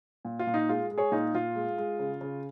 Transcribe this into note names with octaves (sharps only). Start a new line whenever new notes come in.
A#2
F4
A#2
D#4
G#3 F4
G#3
G#4 C#5
A#2 D#4
A#2 F4
G#3
G#3
C#3
C#3